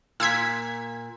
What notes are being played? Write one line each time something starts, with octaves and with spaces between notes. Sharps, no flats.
A#2 E6 G#6 B6